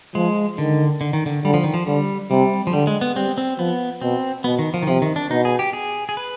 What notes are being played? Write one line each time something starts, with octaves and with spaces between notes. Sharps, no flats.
F3 G#3
D3 D#3
D3
D#3
D3
D3 G3
F3
D#3
F3
D3 G3
C3 G3
F3
D3 G3
G#3
B3
G3 C4
C4
F3 B3
B2 C4
B2 B3
D#3
F3
D#3
C3 F3
D#3
D4
B2 D#4
G#4
G4
G#4
G#4
B4